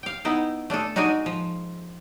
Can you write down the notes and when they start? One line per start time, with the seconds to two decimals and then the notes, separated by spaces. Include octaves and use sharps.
0.03 F5 G5
0.25 B3 D#4 E4 G5
0.70 A3 D4 G#4 A4
0.96 G#3 D#4 F#4 G#4 D5 G#5
1.26 F3